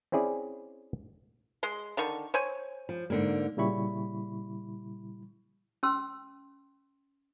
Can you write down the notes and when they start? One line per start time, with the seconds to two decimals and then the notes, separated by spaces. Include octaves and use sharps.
0.12 C4 C#4 E4 G#4 D5
1.63 G#3 C6
1.97 D3 D#3 C#6
2.34 C5 C#5 G#5
2.89 F3
3.10 G#2 D3 A#3
3.57 A#2 C#3 G3 E4 B5 C#6
5.83 C#4 G5 C6 E6